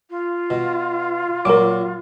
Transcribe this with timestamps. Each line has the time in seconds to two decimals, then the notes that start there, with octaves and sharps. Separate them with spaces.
0.10 F4
0.50 B2
1.45 A#2 F#3 A#4 D6